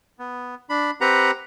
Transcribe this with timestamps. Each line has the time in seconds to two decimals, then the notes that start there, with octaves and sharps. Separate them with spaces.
0.19 B3
0.69 D4 B5
1.01 C4 G4 B4 F#5 A#5